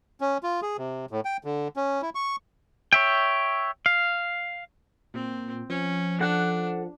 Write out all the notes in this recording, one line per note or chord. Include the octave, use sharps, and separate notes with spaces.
C#4
F4
G#4
C3
A2
G5
D3
C#4
E4
C#6
C#5 E5 G5
F5
A#2 C4
F3 C#4
D4 A4 F#5 F#6